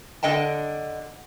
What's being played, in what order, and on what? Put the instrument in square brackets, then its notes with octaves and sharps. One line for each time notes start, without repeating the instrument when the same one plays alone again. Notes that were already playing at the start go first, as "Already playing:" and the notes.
[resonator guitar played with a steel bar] D3 D#5 G5 A5